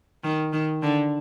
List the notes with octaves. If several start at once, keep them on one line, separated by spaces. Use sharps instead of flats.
D#3
D#3
D3